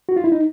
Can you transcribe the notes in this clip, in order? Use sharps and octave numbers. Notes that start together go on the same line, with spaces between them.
F#4
F4
E4
D#4